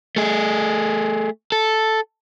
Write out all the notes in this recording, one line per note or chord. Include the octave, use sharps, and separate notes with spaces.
A3 G#4
A4